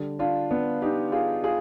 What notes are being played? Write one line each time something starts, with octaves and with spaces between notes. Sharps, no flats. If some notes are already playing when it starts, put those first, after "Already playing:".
Already playing: D3 G3
D4 F4
B3 D4
D#4 G4
F4 G#4
F4 G#4